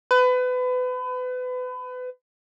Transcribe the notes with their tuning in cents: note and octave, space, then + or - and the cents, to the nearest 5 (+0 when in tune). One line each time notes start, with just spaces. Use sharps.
B4 +30